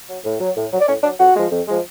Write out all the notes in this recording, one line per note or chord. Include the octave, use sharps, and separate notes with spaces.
F#3
A2
F#3
A2
F#3
D5
A2 C#4 C#5
F#3 D4 D5
F2 F#4 F#5
F3 G#3
F2
F3 G#3